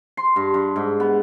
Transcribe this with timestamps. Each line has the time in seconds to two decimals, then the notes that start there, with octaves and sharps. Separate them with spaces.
0.17 C6
0.36 G2
0.54 G2
0.76 G#2
1.00 B3